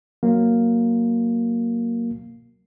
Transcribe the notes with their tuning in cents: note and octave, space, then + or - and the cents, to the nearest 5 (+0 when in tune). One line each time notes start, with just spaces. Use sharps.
F#3 +0 A#3 +0